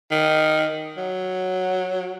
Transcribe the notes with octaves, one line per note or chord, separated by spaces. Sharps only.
D#3
F#3